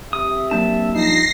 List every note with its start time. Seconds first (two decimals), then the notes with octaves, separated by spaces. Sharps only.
0.13 C4 G4 E5 D#6
0.51 F#3 A#3 D4 A5
0.93 F3 G3 D#4 A#6 C7